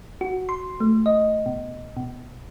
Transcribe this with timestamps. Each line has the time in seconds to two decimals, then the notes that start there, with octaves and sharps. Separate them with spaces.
0.21 F#4
0.49 C6
0.80 A3
1.06 D#5
1.46 B2
1.97 B2